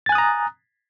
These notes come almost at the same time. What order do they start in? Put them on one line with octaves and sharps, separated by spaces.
A6 G#5 F#6 D#6 A#5